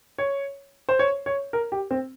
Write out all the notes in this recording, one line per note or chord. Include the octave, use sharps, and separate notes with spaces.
C#5
C5
C#5
C#5
A#4
G4
C4